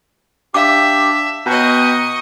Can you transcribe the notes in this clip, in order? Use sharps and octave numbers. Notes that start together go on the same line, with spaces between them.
D4 G4 E5 F5 D6
B2 D#5 G5 A#5 B5 C#6